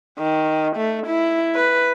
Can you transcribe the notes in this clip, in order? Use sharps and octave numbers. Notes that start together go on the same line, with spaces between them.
D#3
A3
E4
B4